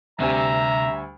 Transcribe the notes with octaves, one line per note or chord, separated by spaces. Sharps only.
D2 C3 G3 E5 G#5 A#5